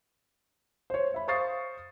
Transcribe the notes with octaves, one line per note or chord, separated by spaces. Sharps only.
C5 C#5
E5 B5
C5 F5 C#6 D#6 A6 C7